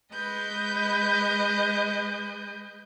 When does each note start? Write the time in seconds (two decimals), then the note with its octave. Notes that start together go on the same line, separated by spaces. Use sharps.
0.11 G#3 B4 D#5 G6